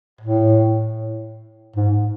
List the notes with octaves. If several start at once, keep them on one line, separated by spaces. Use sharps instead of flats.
A2
G#2